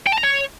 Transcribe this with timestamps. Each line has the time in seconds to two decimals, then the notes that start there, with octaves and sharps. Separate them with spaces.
0.06 G5
0.12 A5
0.18 A#5
0.23 C#5